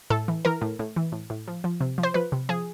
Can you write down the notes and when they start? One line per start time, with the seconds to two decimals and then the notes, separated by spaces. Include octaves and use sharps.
0.10 A2 A4
0.28 E3
0.45 E3 A#4
0.62 A2
0.79 A2
0.96 E3
1.12 A2
1.30 A2
1.47 F3
1.64 F3
1.81 C3
1.98 F3
2.03 C5
2.14 F3 B4
2.32 C3
2.49 F3 G#4